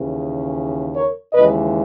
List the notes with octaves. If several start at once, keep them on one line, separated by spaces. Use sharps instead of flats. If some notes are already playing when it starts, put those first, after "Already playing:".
Already playing: D#2 C#3 E3
A#4 C#5
D#2 C#3 E3 G#3 B4 D#5